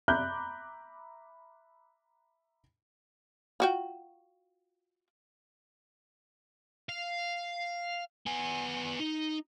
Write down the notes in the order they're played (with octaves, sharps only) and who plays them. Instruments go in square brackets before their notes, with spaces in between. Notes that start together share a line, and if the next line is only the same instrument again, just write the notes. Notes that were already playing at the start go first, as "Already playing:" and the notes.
[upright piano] E5 A#5 B5 D6 F#6 G6
[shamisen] F4 F#4 G5
[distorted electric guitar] F5
B3 G#5
D#4